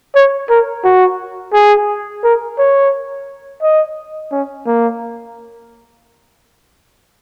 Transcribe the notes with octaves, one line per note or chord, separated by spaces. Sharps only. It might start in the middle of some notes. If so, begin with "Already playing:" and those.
C#5
A#4
F#4
G#4
A#4
C#5
D#5
C#4
A#3